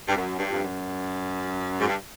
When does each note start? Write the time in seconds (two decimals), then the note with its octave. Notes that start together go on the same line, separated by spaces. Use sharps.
0.08 G2
0.16 F#2
0.38 G2
0.51 F2
0.62 F#2
1.81 G#2
1.88 G2